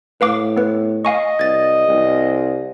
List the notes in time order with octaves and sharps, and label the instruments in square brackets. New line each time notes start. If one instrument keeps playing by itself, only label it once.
[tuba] A2 [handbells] B4 F5 D6
[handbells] B3 B4
[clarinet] D#5 [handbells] F5 G#5 C#6
[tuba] C2 [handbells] G#6 A6
[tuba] C2